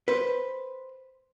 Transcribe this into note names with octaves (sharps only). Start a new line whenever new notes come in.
B4 C5